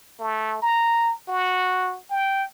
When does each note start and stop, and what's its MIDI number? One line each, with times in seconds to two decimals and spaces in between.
0.20 0.60 57
0.62 1.14 82
1.28 1.97 66
2.10 2.44 79